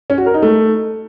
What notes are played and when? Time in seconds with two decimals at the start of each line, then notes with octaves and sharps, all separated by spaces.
0.10 C#4
0.18 F#4
0.26 A#4
0.34 D#4
0.42 A3